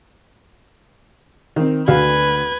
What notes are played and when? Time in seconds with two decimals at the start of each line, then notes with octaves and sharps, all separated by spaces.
1.56 D#3 C4
1.88 D2 F#4 B4 F5 G#6